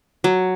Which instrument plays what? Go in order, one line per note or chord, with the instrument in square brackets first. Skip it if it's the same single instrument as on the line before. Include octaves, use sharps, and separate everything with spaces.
[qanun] F#3